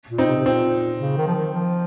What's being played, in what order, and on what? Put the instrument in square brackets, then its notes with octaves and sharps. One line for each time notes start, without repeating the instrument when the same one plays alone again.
[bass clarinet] A#2
[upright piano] C4 D#4
[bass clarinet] C3
C3
[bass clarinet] A#2 [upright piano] C4
[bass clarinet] C#3
D#3
F3
D#3
F3